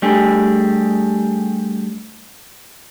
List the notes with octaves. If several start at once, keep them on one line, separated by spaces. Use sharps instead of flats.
G3 A3 D4 G4 G#4